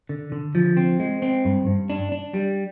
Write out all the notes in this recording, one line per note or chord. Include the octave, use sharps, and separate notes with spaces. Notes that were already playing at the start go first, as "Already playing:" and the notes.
D3
D3
F3
C4
G#3
C4
G2
G2
D4
D4
G3